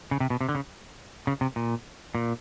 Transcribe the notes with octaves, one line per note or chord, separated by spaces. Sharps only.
C#3
C3
B2
C3
D3
C#3
C#3
C3
A#2
A#2